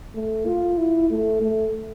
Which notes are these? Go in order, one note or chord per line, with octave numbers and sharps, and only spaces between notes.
A3
F4
E4
A3
A3